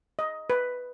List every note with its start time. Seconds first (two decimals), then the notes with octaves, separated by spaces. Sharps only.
0.19 D#5
0.50 B4